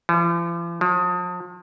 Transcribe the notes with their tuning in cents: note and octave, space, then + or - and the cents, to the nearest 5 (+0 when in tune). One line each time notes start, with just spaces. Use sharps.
F3 -45
F3 +40